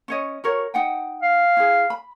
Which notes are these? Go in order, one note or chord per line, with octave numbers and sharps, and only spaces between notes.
C#4 C#5 D#5
F#4 A#4 C#5
D#4 F#5 G5
F5
E4 G#4
B5